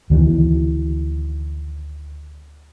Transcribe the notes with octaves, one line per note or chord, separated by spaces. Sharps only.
D2 D#3 E3